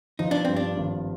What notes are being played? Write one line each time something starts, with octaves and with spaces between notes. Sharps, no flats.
F3 D#4
D4
G2 C4
D4
G#1